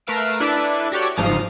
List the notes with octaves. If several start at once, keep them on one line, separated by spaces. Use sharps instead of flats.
A3 A#4 B4 F5 E6 D7
D4 E4 A4 B4 D5 E5
F#4 G4 A4 C#5 D5
G1 G#2 F3 F5 A#5 D#6